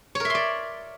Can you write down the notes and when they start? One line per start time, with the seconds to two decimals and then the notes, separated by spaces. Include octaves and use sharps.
0.15 C#5
0.20 A#4
0.25 E5
0.30 C6
0.35 D5